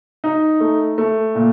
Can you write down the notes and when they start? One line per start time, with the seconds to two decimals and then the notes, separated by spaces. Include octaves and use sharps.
0.24 D#4
0.60 A3
0.98 A3
1.35 A#2